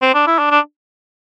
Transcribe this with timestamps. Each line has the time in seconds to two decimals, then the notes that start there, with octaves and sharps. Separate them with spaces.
0.02 C4
0.14 D4
0.27 E4
0.39 D4
0.51 D4